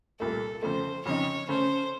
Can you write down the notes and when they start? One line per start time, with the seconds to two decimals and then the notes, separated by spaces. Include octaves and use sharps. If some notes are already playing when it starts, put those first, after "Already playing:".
0.20 C2 A#2 A3 A4
0.62 F2 C#3 A3 C5
1.05 F2 C#3 F3 C4 D#4 C#5
1.48 C#3 A3 C#4 A4 C5